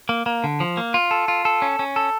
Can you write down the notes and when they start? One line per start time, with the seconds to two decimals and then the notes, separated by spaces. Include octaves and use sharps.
0.09 A#3
0.26 A#3
0.44 D3
0.60 F3
0.77 A#3
0.94 F4
1.11 A4
1.28 F4
1.45 A4
1.62 C#4
1.79 C#4
1.96 A4